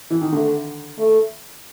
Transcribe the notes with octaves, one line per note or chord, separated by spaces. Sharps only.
E3
D#3
D3 A3
A3